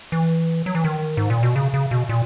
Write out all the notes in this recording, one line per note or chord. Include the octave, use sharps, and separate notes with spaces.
E3
F#3
E3
D#3
G#2
A#2
B2
C#3
C#3
B2
A#2